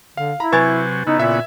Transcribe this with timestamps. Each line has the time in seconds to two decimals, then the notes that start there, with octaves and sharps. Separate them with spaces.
0.17 D3 F5
0.40 E4 A#5 B5
0.52 C3 F#3 B4 G#5 B5 C#6 G#6 A6
1.07 C#3 B3 D#4 E4
1.20 A#2 E5